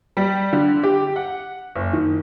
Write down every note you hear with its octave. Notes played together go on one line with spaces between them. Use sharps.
G3
D3
G4
F#5
F#1
D#3